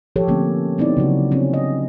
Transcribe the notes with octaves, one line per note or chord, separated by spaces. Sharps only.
F3 G4 A4 C#5
D3 A3 A#3 C4 C#4
B3 C4 D#4 E4 D5
C#3 F#3 F#4
C4 C#4
D#5